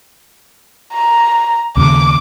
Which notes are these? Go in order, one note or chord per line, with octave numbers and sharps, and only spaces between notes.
A#5
D#2 C#3 D6